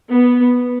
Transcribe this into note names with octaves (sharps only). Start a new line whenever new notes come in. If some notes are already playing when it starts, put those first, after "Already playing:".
B3